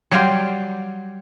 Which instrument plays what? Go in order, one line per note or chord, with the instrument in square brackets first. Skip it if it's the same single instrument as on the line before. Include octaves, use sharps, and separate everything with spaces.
[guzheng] F#3 G3 D5 F5 G5 C6